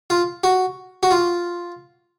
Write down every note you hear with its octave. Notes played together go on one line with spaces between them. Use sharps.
F4
F#4
F#4
F4